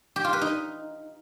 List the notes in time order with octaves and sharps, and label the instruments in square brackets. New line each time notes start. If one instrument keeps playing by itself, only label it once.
[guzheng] G4
F4
B4
D#4